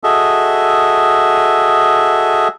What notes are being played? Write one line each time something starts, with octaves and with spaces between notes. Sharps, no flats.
F#4 G#4 A4 D#5 E5